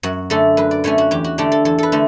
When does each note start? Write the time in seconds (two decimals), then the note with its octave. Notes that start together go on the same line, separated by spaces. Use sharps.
0.03 F#2 F#4
0.30 D3 A3 C#4 A4
0.57 F#2 B4
0.71 D5
0.84 D3 A3 C#4 C#5
0.98 F#4
1.11 E2 G4
1.24 F#4
1.38 D3 A3 D4 G4
1.52 A4
1.65 E2 A4
1.78 A4 B4
1.92 D3 A3